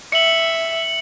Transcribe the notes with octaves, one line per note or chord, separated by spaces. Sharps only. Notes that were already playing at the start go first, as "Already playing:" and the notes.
E5 C#7 F#7